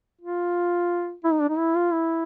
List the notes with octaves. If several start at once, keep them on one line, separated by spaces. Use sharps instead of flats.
F4
E4
D#4
D4
D#4
E4
F4
E4